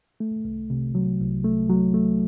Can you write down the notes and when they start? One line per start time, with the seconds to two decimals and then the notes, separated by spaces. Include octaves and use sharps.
0.20 A3
0.45 C2
0.70 C3
0.95 F#3
1.21 C2
1.44 A3
1.69 F#3
1.94 A3